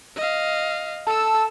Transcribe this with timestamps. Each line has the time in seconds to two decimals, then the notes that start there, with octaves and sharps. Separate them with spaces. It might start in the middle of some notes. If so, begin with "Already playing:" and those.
0.16 D#5 F5
1.07 A4 A5 E6